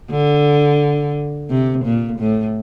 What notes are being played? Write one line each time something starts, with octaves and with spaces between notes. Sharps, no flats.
D3
C3
A#2
A2